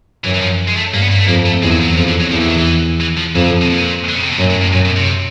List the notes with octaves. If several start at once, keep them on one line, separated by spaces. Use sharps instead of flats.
F#2 E3
E3
F3
G#3
A3
G2 A#3
B3
A#3
A3
F2 A#3
A3
E2 G#3
F#3
F3
F#3
F2 F3
D3
F#3
E2 F3
E3
D#3
E3
E3
F3
F2 E3
D3
B2
A#2
D3
C#3
C3
B2
F#2 A#2
A2
A2
F#2 A#2
B2
C3